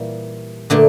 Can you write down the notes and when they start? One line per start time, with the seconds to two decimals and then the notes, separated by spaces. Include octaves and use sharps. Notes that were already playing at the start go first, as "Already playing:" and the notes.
Already playing: A#2 E3 G3 A#3
0.70 A#2 D3 A3 D4